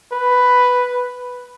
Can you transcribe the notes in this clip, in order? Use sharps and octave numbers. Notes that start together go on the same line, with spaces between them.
B4